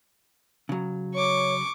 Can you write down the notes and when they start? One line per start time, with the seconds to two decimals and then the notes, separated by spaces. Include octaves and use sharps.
0.69 C#3 F#3
1.15 C#5 C#6 D6